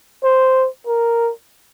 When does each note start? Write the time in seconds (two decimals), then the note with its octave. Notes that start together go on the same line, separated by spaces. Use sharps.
0.24 C5
0.87 A#4